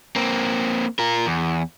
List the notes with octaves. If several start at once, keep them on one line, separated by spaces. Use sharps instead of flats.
A#3 C4
F4 A#4
E2